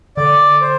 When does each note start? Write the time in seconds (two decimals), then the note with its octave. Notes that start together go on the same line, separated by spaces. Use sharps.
0.17 D3 D5
0.61 C5